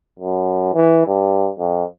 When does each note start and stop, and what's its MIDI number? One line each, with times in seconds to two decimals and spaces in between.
0.19 0.74 42
0.74 1.06 52
1.07 1.50 43
1.59 1.84 41